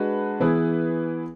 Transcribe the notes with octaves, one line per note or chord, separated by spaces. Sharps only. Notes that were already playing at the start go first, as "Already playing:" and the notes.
Already playing: G#3 D4 F#4 B4
E3 B3 E4 G#4 B4